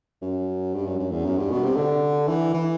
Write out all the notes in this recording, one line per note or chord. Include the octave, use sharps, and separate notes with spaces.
F#2
G2
F#2
F#2
E2
F#2
G2
B2
C3
D3
E3
E3